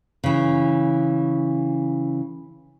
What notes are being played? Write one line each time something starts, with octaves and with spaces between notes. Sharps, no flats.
C#3 E3